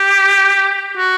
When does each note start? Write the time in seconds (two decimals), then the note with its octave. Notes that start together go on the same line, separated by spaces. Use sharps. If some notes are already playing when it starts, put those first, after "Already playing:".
Already playing: G4
0.97 F#4